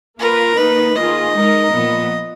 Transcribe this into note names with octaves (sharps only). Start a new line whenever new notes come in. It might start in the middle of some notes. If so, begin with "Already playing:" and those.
A#3 F4 A#4 B4
D#3 A#3 D#4 B4
D#3 A#3 F4 G#4 D#5
G#3 D#4 A#4
A#2 F3 B3